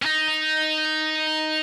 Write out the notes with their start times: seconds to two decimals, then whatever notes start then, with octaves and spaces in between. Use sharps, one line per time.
0.02 C#4
0.06 D#4